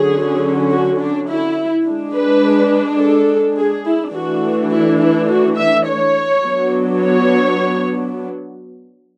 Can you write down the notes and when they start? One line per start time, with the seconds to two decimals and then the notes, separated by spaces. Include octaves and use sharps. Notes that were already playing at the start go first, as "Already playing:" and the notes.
Already playing: D3 F#3 C#4 G#4
0.71 F#4
1.00 D4
1.28 E4
1.86 G#3 D4
2.14 B4
3.00 A4
3.57 G#4
3.86 E4
4.14 E3 A3 D4 F#4
4.72 E4
5.00 E4
5.28 F#4
5.57 E5
5.86 C#5
6.44 F#3 B3 D4
7.00 C#5